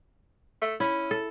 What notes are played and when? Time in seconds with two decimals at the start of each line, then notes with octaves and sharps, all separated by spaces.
0.61 A3
0.80 C#4 E4
1.11 A4